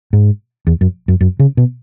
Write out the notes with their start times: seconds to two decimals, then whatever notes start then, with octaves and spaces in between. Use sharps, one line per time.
0.13 G#2
0.67 E2
0.81 F#2
1.08 F#2
1.21 F#2
1.39 C#3
1.57 B2